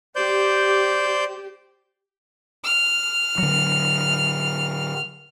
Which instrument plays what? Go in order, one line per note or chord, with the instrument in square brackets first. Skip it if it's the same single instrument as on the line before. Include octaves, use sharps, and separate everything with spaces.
[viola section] G4 [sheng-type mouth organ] C5 D5 G6
[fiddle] F6
[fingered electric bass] D3 F#3